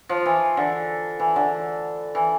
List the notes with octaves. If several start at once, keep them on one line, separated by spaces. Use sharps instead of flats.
F3
E3
D3
E3
D3
E3